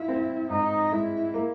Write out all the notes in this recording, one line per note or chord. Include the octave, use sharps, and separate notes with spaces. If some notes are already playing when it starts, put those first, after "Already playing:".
Already playing: E4 F4
C4
G#2 D#4
G#3 E4
A#3